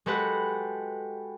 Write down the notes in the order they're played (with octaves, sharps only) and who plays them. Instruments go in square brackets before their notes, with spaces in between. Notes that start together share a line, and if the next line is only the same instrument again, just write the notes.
[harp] G#3 F#4 G4 A4 B4 F#5